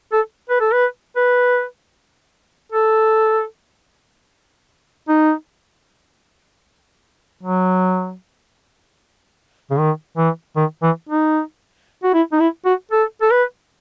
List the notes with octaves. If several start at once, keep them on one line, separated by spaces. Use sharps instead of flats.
A4
B4
A4
B4
B4
A4
D#4
F#3
C#3
D#3
E3
D#3
E3
D#4
F#4
E4
D#4
E4
F#4
A4
A4
B4